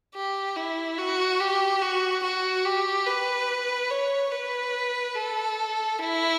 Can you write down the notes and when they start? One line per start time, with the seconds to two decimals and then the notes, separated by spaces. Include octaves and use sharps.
0.15 G4
0.57 E4
0.99 F#4
1.40 G4
1.82 F#4
2.23 F#4
2.65 G4
3.06 B4
3.90 C#5
4.32 B4
5.15 A4
5.98 E4